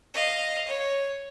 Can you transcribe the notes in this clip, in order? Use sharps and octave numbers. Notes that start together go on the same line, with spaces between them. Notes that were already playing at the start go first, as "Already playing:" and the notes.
D#5 F5
C#5